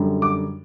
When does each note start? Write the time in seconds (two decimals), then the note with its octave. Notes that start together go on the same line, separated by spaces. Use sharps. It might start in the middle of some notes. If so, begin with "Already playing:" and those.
Already playing: F#2 D3 G3
0.22 D6